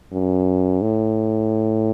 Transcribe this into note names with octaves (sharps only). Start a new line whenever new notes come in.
F#2
A2